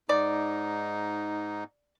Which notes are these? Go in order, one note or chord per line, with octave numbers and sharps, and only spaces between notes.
G#2 D#4 D5